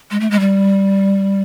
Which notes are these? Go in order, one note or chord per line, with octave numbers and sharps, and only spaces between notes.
G#3
A3
G#3
G3